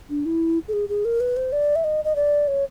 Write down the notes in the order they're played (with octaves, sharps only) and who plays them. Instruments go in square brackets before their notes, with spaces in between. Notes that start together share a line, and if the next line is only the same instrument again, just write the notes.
[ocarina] D4
E4
A4
G#4
G#4
A#4
B4
C5
D5
E5
D#5
D#5
D5
C#5